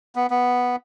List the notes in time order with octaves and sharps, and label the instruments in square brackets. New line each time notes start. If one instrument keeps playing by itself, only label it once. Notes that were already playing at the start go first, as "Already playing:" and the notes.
[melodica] B3
B3